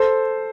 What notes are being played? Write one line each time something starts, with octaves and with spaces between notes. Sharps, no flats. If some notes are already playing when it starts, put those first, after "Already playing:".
Already playing: A4 C5